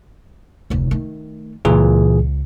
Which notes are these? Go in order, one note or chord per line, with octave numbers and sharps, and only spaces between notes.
F1 D2
D#3 A3
C#2 A#2 E3 G#4